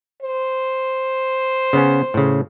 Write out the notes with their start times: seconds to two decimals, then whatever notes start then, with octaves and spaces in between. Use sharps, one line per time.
0.22 C5
1.73 C#3 B3 C#4
2.14 A2 C#3